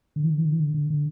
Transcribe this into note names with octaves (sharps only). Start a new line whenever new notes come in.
D3
E3
D3
E3
D3
E3
D3
D3
D3